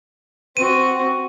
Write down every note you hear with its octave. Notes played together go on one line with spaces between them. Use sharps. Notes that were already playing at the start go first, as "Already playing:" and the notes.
C4 F#4 D#7